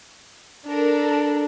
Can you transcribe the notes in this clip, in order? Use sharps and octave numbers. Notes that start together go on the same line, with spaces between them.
D4 A4 A#4